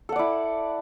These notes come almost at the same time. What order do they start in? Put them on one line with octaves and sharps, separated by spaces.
A4 F#5 D5 E4